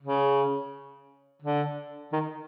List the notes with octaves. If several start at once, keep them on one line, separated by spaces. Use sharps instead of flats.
C#3
D3
D#3